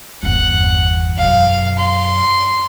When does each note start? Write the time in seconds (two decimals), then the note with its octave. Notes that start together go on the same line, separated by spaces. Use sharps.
0.23 G1 E2 F#5
1.18 F#2 B2 F5
1.79 C6